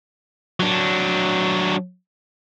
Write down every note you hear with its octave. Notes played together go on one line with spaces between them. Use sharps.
F#3 D4